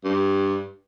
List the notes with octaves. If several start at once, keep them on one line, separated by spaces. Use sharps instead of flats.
G2